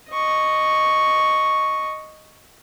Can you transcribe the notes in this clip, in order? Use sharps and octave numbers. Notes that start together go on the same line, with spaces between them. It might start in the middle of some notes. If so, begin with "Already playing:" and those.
D#5 C#6